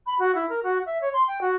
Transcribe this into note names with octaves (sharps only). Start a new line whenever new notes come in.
B5
F#4
E4
A#4
F#4
E5
C#5
C6
G5
F#4